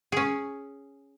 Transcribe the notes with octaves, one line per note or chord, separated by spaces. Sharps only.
C#4 G#4